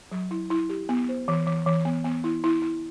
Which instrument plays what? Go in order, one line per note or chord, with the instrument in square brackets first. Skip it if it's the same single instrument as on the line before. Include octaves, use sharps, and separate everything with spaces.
[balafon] F#3
E4
E4
G4
B3
C5
E3
E3
E3
B3
B3
E4
E4
E4